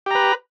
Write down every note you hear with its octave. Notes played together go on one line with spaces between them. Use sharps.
G4 B4 A#5